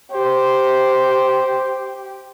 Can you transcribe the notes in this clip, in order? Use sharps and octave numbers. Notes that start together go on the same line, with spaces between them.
G4 C5